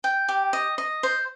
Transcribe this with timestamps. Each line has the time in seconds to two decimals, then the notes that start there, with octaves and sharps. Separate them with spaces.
0.04 G5
0.28 G4
0.53 D#5
0.78 D#5
1.03 C5